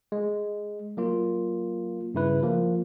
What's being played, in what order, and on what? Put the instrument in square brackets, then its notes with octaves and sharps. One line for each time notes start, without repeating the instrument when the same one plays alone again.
[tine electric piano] G#3
F#3 A#3 F4
G2 C#3 E4 B4
F3 A#3